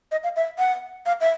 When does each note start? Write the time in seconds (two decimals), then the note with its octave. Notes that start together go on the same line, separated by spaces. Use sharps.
0.12 D#5
0.24 F5
0.36 E5
0.59 F#5
1.06 F5
1.21 E5